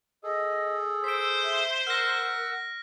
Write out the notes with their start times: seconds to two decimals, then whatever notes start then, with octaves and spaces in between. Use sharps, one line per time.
0.23 G#4 A4 D#5
1.04 C5 E6 B6 D7
1.43 E5
1.87 A#4 F#5 E6 F6 A#6